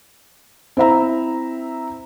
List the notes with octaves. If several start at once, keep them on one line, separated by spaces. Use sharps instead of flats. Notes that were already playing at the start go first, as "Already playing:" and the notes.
C4 E4 E5 A#5